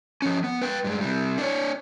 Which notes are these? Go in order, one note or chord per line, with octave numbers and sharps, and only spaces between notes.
F3 C#4
B3
B4 G5
G2 G#3
C3 G3
D4 C#5